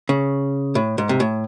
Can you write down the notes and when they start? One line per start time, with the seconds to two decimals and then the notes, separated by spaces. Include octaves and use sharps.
0.09 C#3
0.75 A2
0.98 G#2
1.09 C3
1.20 A2